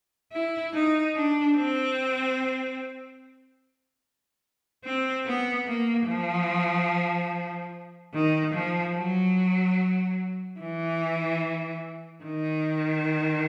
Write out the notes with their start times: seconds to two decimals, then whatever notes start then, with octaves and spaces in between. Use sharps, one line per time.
0.32 E4
0.73 D#4
1.15 D4
1.56 C4
4.85 C4
5.26 B3
5.67 A#3
6.07 F3
8.14 D#3
8.54 F3
8.96 F#3
10.59 E3
12.24 D#3